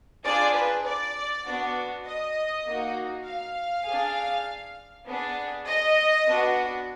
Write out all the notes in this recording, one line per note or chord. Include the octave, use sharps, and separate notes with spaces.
D4 F4 G#4 D5
B4
D5
B3 D4 F#4
D#5
A#3 D#4 F#4
F5
D4 G#4
B3 D4 G#4
D#5
B3 D4 F#4